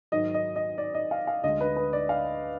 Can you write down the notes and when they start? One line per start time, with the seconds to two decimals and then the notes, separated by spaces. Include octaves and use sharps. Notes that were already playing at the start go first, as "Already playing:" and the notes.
0.12 G#2 D#3 F#3 D#5
0.34 D#5
0.56 D#5
0.78 D5
0.94 D#5
1.11 F5
1.27 F5
1.44 D2 D3 G#3 D#5
1.61 B4
1.76 B4
1.93 D5
2.09 F5